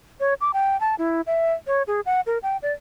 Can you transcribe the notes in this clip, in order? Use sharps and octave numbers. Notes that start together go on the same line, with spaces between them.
C#5
D6
G5
A5
E4
E5
C#5
G#4
F#5
A#4
G5
D5